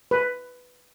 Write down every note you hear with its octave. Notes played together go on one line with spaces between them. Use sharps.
B4